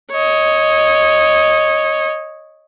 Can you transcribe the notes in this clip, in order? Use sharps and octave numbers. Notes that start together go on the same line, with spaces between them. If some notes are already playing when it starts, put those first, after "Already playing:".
C#5 D#5